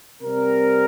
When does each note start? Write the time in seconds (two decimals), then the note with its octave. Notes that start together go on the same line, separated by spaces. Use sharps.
0.22 C3 G3 C4 A#4